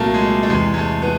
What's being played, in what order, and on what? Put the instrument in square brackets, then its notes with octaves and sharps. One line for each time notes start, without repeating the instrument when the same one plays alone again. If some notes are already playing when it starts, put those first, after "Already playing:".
Already playing: [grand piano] C2 A#2 F#3 A3 A#3
G#3
A3
A3
E2 C3 E3 G#3
G#3
A3
B3